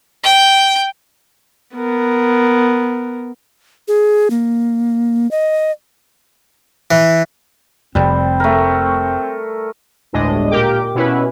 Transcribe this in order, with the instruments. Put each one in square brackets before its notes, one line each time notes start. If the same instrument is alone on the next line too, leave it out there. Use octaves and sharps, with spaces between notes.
[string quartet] G5
[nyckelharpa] B3 A#4
[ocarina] G#4
A#3
D#5
[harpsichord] E3
[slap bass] F1 F2 [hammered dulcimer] G3 [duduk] C4
[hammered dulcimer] A3 A#4
[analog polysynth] G1 D2 A2 G#3 D4 D#5
A#2 G4 A#4 G5 D6
B2 C#4 E4 B4